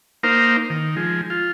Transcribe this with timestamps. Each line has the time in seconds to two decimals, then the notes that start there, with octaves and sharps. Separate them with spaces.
0.23 A#3 D#4 A#4 C5 F5
0.70 D#3
0.97 F3 G#3
1.30 F4